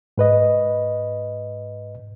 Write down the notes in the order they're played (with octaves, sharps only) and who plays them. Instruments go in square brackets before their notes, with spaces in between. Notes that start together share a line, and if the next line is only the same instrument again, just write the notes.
[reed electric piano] G#2 B4 D#5